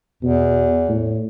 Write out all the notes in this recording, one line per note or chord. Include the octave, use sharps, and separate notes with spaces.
E2 B2
A2